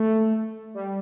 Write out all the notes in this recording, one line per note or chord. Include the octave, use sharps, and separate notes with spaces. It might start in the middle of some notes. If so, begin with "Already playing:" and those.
Already playing: A3
G3